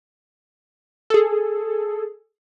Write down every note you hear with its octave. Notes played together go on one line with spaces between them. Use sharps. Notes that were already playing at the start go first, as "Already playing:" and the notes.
G#4 A4